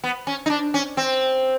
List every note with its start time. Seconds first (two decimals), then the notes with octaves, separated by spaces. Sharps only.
0.04 B3
0.27 C#4
0.46 D#4
0.50 D4
0.74 C#4
0.97 C4